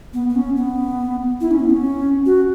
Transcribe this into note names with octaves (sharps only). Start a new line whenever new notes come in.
B3
B3
C#4
B3
E4
C#4
B3
C#4
F#4